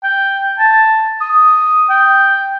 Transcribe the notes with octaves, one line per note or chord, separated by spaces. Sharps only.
G5
A5
D#6
G5